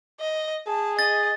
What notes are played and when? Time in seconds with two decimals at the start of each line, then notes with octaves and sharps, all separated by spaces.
0.20 D#5
0.67 G#4 A5
0.99 D#5 A6